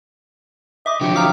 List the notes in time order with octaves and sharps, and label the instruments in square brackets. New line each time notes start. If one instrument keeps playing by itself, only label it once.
[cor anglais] D#5 [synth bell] E5 D6
[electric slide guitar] D3 F3 F#3 [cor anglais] G4
[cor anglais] F5 [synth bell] G5 A#5 D6